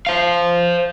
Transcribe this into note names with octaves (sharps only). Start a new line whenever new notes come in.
C5 F5